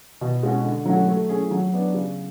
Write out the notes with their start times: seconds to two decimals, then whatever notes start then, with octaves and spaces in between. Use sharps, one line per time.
0.21 B2
0.43 G#3 C#4 F#4
0.64 D3
0.85 F#3 A3 C#4 F#4
1.08 A3
1.29 C#4 G#4
1.51 F#3
1.73 B3 D4
1.94 C#3